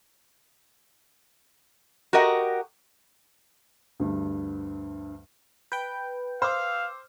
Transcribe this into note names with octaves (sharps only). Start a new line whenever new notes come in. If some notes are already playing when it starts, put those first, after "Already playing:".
F#4 G4 A#4 D#5 F#5
D2 G2
B4 G5 G6
C5 F5 D6 E6 F6